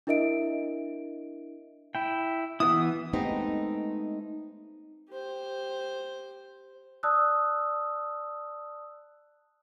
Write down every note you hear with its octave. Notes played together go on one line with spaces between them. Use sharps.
D4 E4 A#4 D#5 E5 D7
E4 G5
E3 B3 E4 D#6
G#3 A3 B3 C4 D#4 G4
G4 C5
D5 A5 D#6 E6 F#6